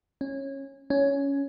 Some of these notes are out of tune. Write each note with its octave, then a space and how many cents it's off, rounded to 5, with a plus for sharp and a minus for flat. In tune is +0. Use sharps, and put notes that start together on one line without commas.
C#4 -20
C#4 +10